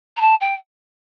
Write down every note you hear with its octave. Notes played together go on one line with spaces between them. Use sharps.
A#5
A5
G5